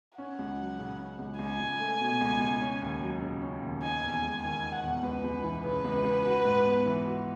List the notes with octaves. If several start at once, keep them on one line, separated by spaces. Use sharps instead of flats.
C#4 F#5
C#2
F#3
C#3
C#4
C#2
C#2 G#5
C#2
A3
B2
C#2
C#2
C#4
D#2
F#3
C#3
C#4
D#2
D#4 G#5
E2
G#5
G#3
D#3 G#5
D#4
F#5
E2
C#2 B4
C#2
E3
C#3 B4
C#2
C#2
F#4
G#2
B3
E3
F#4